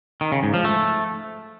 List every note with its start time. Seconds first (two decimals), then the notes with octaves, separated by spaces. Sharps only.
0.21 D#3
0.32 C#3
0.43 G#2
0.54 F3
0.65 A3